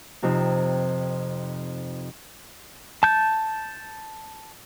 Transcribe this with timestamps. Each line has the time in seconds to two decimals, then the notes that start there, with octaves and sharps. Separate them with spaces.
0.23 F2 C3 D#4
3.03 A5 G6